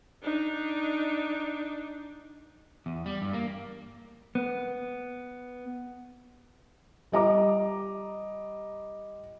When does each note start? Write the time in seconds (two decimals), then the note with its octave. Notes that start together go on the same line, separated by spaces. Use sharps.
0.23 D4 D#4
2.86 E2
3.06 G3
3.22 G2
3.33 A#3
4.35 B3
7.12 G3 D#5 A#5 D6